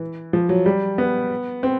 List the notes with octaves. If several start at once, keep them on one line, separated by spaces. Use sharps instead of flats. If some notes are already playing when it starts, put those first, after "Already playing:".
Already playing: E3
F3
F#3
G3
B3
C4